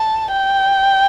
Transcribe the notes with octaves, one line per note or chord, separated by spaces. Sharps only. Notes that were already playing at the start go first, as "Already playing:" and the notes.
Already playing: A5
G5